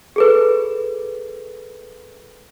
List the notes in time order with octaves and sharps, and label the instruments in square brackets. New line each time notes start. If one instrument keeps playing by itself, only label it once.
[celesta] G#4 A4 B4